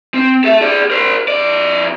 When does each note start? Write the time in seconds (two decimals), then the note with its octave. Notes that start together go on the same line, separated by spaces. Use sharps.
0.14 C4
0.44 A4 E5
0.62 G#4 D5
0.90 A#4 C5
1.28 F2 D5